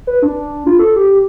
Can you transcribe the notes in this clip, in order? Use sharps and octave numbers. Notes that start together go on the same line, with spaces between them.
B4
D4
F4
A4
G4